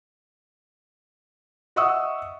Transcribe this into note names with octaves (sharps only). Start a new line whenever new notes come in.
D#5 E5 F#5 C#6 D#6 E6